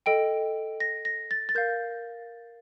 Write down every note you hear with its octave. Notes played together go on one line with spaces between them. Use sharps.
A4 D#5 G5 D7
A#6
A#6
A6
A6
A#4 F5 G6